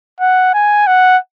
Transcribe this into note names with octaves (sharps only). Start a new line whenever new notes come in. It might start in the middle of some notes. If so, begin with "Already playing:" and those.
F#5
G#5
F#5